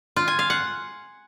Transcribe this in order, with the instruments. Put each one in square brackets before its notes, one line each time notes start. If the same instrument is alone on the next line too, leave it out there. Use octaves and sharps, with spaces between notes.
[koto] F4
G#5
F5
F#5